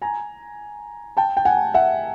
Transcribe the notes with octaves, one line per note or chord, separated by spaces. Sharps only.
G#5 A#5
G5 A5
G5
F#5 G#5
E5 F#5